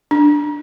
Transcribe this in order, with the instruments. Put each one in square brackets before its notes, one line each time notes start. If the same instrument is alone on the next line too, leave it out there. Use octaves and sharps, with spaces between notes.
[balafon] D4